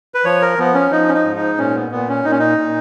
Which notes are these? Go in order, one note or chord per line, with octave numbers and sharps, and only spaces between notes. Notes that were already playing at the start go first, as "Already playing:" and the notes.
B4
F3 C#5
A#4
F3 B3
C#4
F3 D#4
C#4
D#4
G#2
D#4
A#2 C#4
B3
A#2 B3
C#4
A#2 D#4
C#4
D#4
A#2